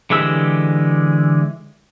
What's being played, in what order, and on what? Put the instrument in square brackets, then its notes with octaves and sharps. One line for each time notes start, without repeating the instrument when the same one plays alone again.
[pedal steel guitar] D3 E3 G#3 G4 E6